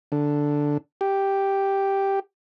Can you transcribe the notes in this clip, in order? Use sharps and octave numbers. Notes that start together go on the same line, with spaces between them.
D3
G4